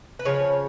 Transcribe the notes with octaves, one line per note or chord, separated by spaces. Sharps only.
B4
C#3 F3 C#5